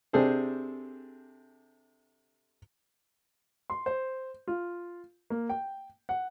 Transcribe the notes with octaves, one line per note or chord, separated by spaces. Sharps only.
C3 D4 G#4 A4 C5
C6
C5
F4
A#3
G5
F#5